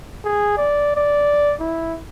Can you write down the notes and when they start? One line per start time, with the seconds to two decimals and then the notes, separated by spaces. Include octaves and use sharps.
0.25 G#4
0.57 D5
0.96 D5
1.60 E4